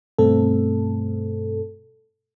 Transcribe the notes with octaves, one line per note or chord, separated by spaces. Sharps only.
G2 B2 A3 C4 A4